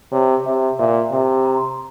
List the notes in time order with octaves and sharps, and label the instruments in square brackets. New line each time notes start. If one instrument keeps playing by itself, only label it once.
[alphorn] C3 [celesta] C#5
[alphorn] C3 [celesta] E5
[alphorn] A#2 [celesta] E5
[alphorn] C3 [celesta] E5
[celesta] A#5
C6